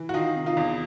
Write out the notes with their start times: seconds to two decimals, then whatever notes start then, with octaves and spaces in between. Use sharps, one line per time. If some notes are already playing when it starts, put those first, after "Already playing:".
Already playing: E3
0.09 F#4
0.14 D#3 D#4 F4
0.36 C3
0.46 D#4 F4
0.57 E2